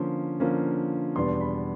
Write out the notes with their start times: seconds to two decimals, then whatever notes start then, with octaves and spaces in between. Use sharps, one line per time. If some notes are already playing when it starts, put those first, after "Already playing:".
Already playing: D3 F3 A#3 C#4 C6
0.40 D3 F3 A#3 C#4
1.16 E2 B2 G3 B3 D4 C6
1.41 B5